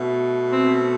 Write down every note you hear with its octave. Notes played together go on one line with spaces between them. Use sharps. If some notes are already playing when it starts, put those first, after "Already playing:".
Already playing: B2 A3
C4